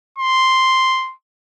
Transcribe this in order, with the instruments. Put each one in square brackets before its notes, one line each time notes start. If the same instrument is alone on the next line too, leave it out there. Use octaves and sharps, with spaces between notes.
[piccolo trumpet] C6